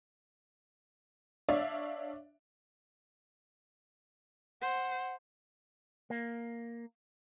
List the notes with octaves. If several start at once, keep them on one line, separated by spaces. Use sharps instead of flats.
D4 C#5 D5 E5 F5
C5 F#5
A#3